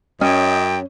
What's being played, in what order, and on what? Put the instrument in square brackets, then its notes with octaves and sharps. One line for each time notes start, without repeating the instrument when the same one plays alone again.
[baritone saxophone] F#2 [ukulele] C#4 [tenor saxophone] D#5 [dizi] G5